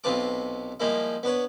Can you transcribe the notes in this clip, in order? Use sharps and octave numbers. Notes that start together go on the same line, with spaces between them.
B1 C3 F4 B4 A5 D6
F3 G3 G#3 A#3 E4
B3 D4 B4 C#5